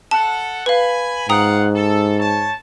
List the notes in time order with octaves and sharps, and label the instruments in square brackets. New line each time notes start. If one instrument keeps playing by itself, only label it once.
[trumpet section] A4 F#5 [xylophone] A5
[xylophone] B4 F5 [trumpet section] G#5 B5
[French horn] G#2 [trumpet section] F4 F#5 [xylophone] G5 A#5 D#6
[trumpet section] A4
C#5 A5